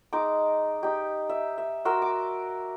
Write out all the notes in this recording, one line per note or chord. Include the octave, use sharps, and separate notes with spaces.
G#3 D#4 D6
D#4 G4
E5
E5
F#4 A#4 C6 E6
D6